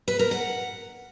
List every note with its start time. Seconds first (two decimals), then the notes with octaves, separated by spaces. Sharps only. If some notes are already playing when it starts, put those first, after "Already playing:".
0.08 B4
0.19 A#4
0.31 F#5